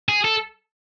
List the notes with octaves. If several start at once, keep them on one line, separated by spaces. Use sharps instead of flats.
G#4
A4